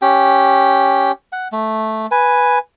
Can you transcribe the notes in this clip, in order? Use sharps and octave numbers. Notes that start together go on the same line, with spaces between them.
C#4 G4 G5
F#5
A3
B4 G#5